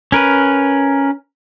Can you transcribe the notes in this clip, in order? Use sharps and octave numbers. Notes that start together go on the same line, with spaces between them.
C#4 A#4 B4